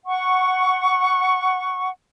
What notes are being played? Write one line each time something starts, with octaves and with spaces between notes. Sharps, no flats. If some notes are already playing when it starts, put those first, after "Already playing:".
F#5 C#6